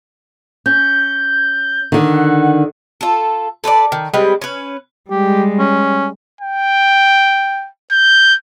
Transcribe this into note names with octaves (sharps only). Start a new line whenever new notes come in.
C#4 G6
D3 D#3
F#5
F4 A4
A4 B4 C5 D5
D#3
G3 G#3 C4 B4
C#4 B4
G3 G#3 G4
C#4
G5
G6